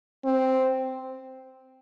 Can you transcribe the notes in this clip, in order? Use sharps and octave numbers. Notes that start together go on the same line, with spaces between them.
C4